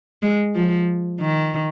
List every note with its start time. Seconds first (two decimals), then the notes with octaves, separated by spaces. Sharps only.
0.22 G#3
0.55 F3
1.20 D#3